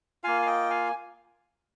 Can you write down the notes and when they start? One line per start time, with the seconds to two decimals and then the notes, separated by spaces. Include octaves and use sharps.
0.23 A#3 F4 F5 G#5
0.42 F5
0.46 D#5 G5
0.70 F5 G#5